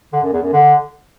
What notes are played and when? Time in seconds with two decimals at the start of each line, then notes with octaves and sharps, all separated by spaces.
0.13 D3
0.23 F#2
0.33 E2
0.42 F#2
0.52 D3